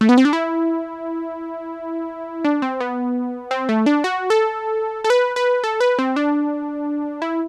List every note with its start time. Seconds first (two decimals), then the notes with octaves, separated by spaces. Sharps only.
0.01 A3
0.09 B3
0.18 C4
0.25 D4
0.33 E4
2.45 D4
2.62 C4
2.80 B3
3.51 C4
3.69 A3
3.86 D4
4.04 F#4
4.30 A4
5.04 A4
5.10 B4
5.36 B4
5.64 A4
5.80 B4
5.99 C4
6.16 D4
7.22 E4